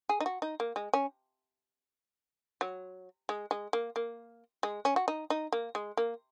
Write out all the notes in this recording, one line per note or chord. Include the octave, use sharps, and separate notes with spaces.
G#4
D#4
F#4
D#4
A#3
G#3
C#4
F#3
G#3
G#3
A#3
A#3
G#3
C#4
F#4
D#4
D#4
A#3
G#3
A#3